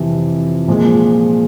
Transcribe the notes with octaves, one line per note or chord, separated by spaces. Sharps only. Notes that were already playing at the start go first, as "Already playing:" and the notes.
Already playing: F2 C3 E3
A#2 F3 G#3